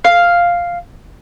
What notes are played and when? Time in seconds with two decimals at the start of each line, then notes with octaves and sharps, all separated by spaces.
0.04 F5